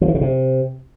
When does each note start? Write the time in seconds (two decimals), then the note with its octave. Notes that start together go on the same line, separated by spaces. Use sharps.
0.01 F3
0.08 E3
0.15 C#3
0.21 C3